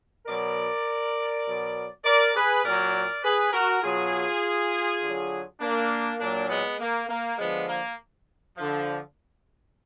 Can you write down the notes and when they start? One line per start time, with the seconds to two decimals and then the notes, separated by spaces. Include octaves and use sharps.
0.27 B2 F#3 A#4 D5
1.46 B2 F#3
2.04 A#4 D5
2.35 G#4 B4
2.64 A#2 F#3 A#4 D5
3.23 G#4 B4
3.53 F#4 A#4
3.82 B2 F#3 F4 G#4
5.02 D3 F#3
5.60 A#3 D4
6.19 A#2 F#3 A#3 D4
6.49 G#3 B3
6.79 A#3
7.09 A#3
7.38 D3 F3 G#3 B3
7.68 A#3
8.56 D3 F3